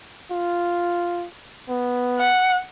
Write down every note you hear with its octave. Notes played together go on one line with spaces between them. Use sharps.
F4
B3
F#5